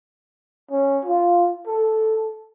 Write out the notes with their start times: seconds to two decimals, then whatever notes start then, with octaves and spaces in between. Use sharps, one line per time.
0.71 C#4
1.05 F4
1.67 A4